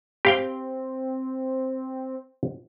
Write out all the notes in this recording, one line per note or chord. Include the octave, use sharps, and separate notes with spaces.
C4 G4 F5 G5